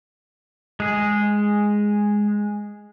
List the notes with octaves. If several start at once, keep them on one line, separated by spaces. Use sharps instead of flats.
G#3 G#4